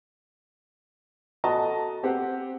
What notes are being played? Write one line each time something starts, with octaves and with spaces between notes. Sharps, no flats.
F#4 A4 D#5 A5 A#5
C4 G4 C5 F#5